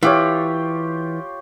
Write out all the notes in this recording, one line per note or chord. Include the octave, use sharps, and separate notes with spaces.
E3 F4 G4 C#5